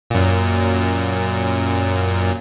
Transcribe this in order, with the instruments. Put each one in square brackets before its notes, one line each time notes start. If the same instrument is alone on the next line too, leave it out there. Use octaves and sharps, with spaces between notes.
[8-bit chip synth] F#2 A#2